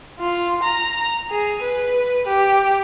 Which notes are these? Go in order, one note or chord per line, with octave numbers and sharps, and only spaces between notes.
F4
A#5
G#4
B4
G4